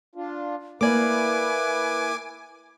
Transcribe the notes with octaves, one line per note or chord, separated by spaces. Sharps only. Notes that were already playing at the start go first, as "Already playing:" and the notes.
D4 F4
A#3 E4 B4 D5 G#5 D6